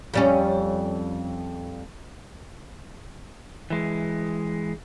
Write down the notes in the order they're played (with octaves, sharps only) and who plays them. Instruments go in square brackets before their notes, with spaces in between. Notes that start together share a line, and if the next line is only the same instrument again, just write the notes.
[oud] F2 G3 C#4
[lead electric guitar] E3 G#3